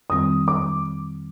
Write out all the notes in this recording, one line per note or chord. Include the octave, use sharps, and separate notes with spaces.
F2 D#3 G3 C4 D#6
D6